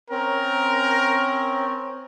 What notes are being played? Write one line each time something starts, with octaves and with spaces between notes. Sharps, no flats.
C4 C#4 A#4